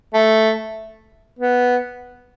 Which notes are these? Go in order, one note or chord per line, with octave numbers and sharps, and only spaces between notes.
A3
B3